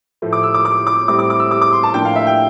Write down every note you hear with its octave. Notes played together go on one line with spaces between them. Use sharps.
A2 F3 A3
D6
E6
D6
D6
D6
A2 G3 C4 E4 D6
D6
D6
E6
D6
D6
C6
A5
A2 F3 A#3 D4 G5
F5
E5
G5